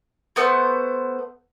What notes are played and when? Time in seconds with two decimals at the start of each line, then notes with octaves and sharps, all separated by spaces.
0.36 A3 B3 C5